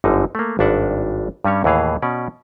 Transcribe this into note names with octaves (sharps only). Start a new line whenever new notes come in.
G1 F#2 D3 D#4
A3 A#3
G#1 G2 D4 E5 F#5
G2 G3 C#4 C#5
D#2 A2 E3 G#4 F5
B2 C#4 D5